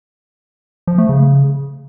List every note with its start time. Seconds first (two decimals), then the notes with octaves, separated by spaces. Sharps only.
0.87 F3
0.98 A3
1.09 C#3